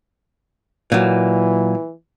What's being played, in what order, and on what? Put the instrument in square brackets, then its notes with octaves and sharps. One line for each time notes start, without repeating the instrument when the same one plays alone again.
[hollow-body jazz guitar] A#2 F#3 [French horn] E3